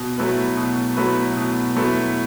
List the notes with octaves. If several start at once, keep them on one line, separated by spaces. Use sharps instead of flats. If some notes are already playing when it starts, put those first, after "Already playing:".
Already playing: B2
F#3 A3 E4 B4
B2
F#3 A3 E4 B4
B2
F#3 A3 E4 B4